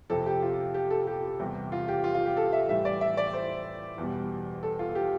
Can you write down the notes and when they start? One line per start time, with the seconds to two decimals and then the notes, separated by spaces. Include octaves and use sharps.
0.10 F2 C3 F3 A4
0.26 G4
0.42 F4
0.74 G4
0.91 A4
1.07 G4
1.39 E2 C3 G3
1.72 F4
1.88 G4
2.04 F4
2.15 F4
2.26 G4
2.37 A4
2.53 E5
2.69 A2 E3 G3 E5
2.85 D5
3.01 E5
3.17 D5
3.33 C5
3.98 E2 B2 G3
4.63 A4
4.79 F4
4.95 G4